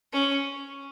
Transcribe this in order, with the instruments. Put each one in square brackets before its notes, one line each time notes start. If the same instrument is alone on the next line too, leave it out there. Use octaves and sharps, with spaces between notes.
[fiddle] C#4